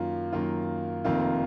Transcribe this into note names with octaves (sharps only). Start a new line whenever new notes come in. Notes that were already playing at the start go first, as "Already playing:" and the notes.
Already playing: F#2 D#3 A#3 F4
F#2 D#3 A#3 F4
F1 F2 D#3 A#3 F4